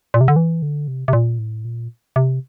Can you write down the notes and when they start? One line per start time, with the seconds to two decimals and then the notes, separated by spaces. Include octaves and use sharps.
0.14 A#2
0.21 C3
0.28 D3
0.36 E3
0.62 D3
0.88 C3
1.08 C3
1.13 A#2
1.39 A2
1.65 A#2
2.16 C3